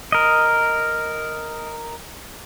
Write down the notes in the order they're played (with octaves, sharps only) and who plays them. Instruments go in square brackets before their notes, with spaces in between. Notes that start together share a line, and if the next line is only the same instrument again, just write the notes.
[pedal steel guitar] A#4 D#5